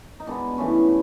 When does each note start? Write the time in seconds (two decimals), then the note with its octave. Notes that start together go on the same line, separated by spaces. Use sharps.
0.20 D#4
0.27 B2 G#3 B3 D4
0.57 G2 E3 A3 C#4